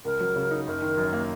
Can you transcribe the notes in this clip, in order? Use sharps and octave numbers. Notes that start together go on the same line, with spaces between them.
C#2 A#4
F#3
C#3
D#4
F#1 A#4
D#3
F#2
A#3